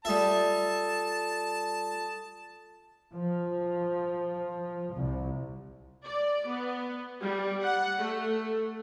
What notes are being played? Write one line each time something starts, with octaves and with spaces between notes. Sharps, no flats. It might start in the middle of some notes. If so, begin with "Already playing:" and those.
G3 F4 A4 E5 A5 D#6
F3
C2
D5
B3
G3
F#5
A3